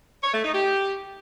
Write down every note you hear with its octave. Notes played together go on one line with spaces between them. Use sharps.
C#5
A3
D#4
G4